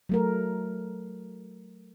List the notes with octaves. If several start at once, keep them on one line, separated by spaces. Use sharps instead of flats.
F#3 A3 A#4